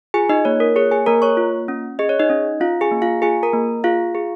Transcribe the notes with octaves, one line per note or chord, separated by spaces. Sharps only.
F4 G#4 G#5
D#4 D#5
A#3 C#5
A#4
G#4 C#5
G#4 G#5
A#3 A#4 A#5
C#5 C#6
F4
C#4
G#4 D#5
C#5
D#4 D#5
C#4
C#4 F4 F5
G#4 G#5
A#3
F4 F5
F4 G#4 G#5
A#4 A#5
A#3
F4 G#4 F5
G#4